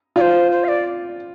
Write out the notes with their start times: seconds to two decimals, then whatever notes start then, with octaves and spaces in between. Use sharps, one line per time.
0.16 F4 D5
0.21 C5
0.52 C5
0.64 F5
0.68 D5